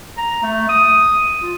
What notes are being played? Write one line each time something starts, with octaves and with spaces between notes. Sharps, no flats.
A#5
A3
D#6
F4